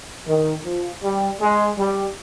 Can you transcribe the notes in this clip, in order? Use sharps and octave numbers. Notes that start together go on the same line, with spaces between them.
D#3
F3
G3
G#3
G3